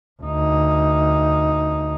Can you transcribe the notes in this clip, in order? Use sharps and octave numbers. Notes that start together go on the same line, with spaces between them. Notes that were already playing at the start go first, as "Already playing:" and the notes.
D2 D#4